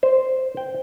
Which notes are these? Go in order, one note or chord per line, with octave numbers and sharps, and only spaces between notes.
C5
G5